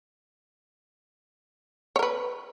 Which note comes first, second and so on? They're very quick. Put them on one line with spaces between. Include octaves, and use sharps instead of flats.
C#5 A#4 B4